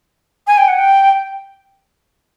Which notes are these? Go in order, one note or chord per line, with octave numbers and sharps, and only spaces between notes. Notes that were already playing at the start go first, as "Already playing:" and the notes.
G#5
G5
F#5
G5